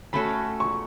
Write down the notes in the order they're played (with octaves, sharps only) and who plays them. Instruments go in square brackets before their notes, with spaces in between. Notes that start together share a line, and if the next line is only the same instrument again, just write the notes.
[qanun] A3 C#4 F#4 A4 [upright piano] B5
[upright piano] C#6